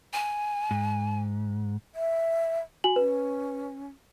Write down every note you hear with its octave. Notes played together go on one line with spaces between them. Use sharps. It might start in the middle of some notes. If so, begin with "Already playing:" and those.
G#5
G#2
E5
F#4 G#5 F#7
C#4 B4